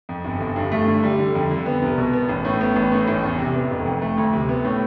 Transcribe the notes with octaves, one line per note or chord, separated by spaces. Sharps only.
F2
G1
G1
G2
A3
D3
G3
D3
F2
D3
B3
C2
B2
B3
A1
A2
B3
A1
A2
A1
E2
C3
B3
F1
F2
A3
D2
C3
B3
A2